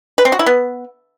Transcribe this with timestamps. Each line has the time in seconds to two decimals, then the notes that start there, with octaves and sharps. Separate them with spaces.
0.18 B4
0.25 C4
0.32 F#4
0.39 E4
0.46 B3